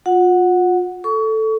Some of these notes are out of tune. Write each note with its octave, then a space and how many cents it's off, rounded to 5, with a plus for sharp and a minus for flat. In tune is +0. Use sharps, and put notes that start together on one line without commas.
F4 +30 F#5 -5
A4 +0 C#6 +30